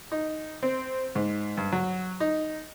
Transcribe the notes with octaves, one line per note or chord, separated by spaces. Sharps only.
D#4
C4
G#2
G2
F#3
D#4